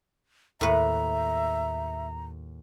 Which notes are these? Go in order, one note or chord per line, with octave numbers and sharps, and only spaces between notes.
D#2 A2 B4 E5 A#5